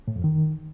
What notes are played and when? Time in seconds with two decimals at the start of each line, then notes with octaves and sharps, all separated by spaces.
0.08 A2
0.16 F2
0.24 D#3